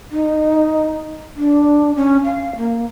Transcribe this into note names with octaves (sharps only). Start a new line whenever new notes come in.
D#4
D4
C#4
F5
A#3